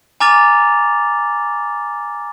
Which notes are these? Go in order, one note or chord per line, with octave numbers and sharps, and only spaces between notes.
G#5 A#5 D6 F6 A6 F7